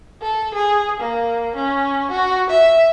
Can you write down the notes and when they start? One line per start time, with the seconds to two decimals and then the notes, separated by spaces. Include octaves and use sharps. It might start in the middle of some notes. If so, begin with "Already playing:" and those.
0.22 A4
0.54 G#4
1.00 A#3
1.56 C#4
2.11 F#4
2.50 E5